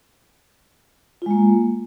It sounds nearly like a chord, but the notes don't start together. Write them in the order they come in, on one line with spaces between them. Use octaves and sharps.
F4 G#3 A#3